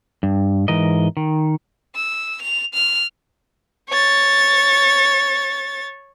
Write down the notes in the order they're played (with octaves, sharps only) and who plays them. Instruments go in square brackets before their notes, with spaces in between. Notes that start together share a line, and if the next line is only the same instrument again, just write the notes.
[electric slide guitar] G2
G#2 E3 A#4 D#5
D#3
[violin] E6
F7
F6
C#5 A6